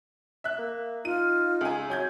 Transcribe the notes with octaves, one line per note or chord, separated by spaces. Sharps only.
E5 F#6
A#3
D#4 F4 D#7
C#2 G#5
F#3 C#5 G#5 G6 G#6